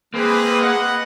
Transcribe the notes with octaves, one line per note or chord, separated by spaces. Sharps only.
G#3 A#3 C4 G#4 B4
B4 D#5 F#5